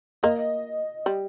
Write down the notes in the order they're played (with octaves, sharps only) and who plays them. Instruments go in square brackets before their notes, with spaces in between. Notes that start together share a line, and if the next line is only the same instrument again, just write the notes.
[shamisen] A#3 [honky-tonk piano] D#5
[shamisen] G3